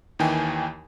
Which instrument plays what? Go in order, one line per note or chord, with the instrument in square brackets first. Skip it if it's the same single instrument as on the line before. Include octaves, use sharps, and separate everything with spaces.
[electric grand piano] D#2 D#3 E3 G5 G#5